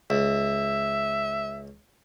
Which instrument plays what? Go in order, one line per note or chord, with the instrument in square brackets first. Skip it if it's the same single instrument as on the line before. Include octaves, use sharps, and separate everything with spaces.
[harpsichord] C#2 [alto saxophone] E5